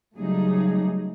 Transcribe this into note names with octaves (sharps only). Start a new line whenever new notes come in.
C#3 F#3 G3 A3 D#4 G#4